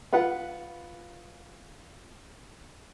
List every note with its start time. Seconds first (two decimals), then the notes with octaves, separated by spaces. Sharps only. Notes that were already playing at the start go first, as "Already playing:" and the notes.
0.13 F4 B4 F#5